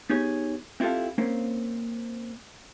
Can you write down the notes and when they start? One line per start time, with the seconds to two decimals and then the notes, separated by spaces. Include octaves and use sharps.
0.10 B3 D#4 G4 G#4 C#5
0.80 C4 E4 F4 G4 A4 F5
1.18 A#3 C4 C#4